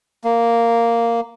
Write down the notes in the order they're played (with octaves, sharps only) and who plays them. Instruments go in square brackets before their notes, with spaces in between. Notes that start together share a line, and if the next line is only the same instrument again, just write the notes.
[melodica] A#3